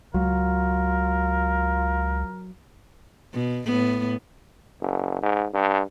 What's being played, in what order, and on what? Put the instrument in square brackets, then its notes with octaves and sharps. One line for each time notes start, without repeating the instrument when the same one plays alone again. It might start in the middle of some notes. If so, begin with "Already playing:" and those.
[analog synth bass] C#2 [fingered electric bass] F#3 [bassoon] F4 [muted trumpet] A#4
[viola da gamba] B2
A2 B3
[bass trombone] F#1
G#2
G2